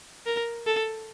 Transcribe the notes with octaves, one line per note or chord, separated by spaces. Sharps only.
A#4
A4